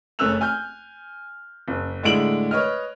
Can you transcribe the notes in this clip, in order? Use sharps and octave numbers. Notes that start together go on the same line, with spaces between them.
F#1 A3 C#4 E6 F#6 F7
G#5 F6 G6
F#1
A2 D3 G#3 E4 D7 F#7
B4 C#5 D#5 F6